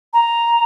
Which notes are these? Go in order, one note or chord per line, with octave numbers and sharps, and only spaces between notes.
A#5